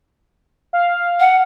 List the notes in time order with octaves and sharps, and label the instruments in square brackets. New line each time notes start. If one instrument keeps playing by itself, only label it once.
[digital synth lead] F5
[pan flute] F#5